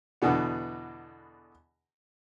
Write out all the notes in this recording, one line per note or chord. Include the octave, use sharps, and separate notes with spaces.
E2 B2 D3 B3